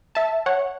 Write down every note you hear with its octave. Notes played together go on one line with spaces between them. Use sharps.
E5 A5
C#5 F#5